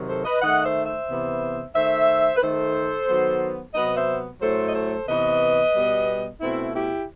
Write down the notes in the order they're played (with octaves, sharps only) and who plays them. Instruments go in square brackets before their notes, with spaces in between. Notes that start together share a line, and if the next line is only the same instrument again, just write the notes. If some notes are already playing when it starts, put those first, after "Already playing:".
Already playing: [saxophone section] C3 D#3 F#3
A4 C5
B4 D#5
D#3 A3 D#5 F#5
C5 E5
C5 E5
C3 E3 B3
D#3 A3 C5 E5
B4
D#3 A3 A4 C5
D#3 F#3 B3
C3 F#3 B3 B4 D#5
C5 E5
A2 F#3 A3 A4 C5
D#5
A4 C5
C3 E3 B3 B4 D#5
B2 G3 B3
B2 A3 C4 E4
E4 G4